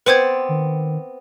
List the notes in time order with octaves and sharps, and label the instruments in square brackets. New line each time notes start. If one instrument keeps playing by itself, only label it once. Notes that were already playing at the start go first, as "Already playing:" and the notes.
[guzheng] B3 C4 D5 [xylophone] B4 C5 G#6
[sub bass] D#3